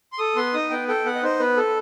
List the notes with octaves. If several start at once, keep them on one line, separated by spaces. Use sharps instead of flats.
C6
A4 D#6
B3 C6
D#4 D#6
B3 G5
A4 G5
B3 F#5
D#5
D#4 C5
B3 B4
A4